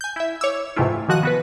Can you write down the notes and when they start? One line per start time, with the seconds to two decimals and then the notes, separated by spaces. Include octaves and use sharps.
0.01 G#5 G6
0.16 E4 E5
0.41 C#5 D6 E6
0.76 G#2 C3 E3 A3 E4 F4
1.08 D#3 F3 F#4 F#5 F#6 D#7
1.23 B3 F#4 B4